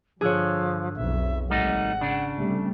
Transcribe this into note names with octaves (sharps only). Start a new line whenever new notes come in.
G2 D3 F3 G#4 C#5
B1 F2 E5
G#1 G3 A3 D#4 F#5
C#3 D4
C3 G3 A3